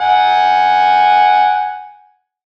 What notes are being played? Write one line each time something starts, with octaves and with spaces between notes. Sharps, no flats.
F#5 G#5